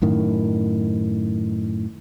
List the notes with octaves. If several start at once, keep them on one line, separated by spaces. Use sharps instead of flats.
F#2 A2 D#3